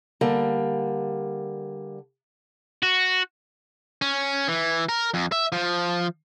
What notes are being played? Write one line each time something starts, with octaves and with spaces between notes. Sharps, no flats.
D3 G3 A#3
F#4
C#4
E3
A#4
F2
E5
F3